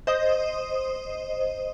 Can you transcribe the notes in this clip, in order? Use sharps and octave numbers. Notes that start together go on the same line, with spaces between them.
C5 D#5 D#6